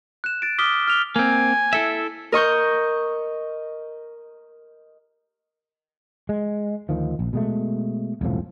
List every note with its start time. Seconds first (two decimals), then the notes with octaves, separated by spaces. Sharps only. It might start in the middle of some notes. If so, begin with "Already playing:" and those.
0.24 F#6 E7
0.42 A6 D7
0.58 D6 D#6 F6 B6 G7
0.88 F6 F7 G7
1.16 A#3 C4 G#5
1.73 E4 A4 E5
2.32 A#4 D#5 C#6 G6
6.29 G#3
6.89 D2 D#3 F3
7.19 A#1
7.33 B2 G#3 A3
8.21 E1 C2 A2 F3